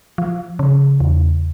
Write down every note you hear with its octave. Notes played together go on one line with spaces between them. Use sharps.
F3
C#3
E2